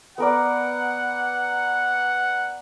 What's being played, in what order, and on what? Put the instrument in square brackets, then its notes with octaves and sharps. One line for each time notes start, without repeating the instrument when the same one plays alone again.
[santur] B3 A#4 D5 [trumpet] F#5